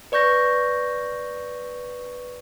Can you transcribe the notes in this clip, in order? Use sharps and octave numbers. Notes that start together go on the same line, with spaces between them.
B4 D5 C#6 G6 A#6